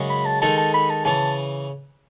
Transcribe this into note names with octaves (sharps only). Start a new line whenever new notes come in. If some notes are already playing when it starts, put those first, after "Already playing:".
Already playing: F#2 C#3 G#3
B5
A5
D#3 G#3 D#4 A4 A5
A5
B5
A5
C#3 E3 A5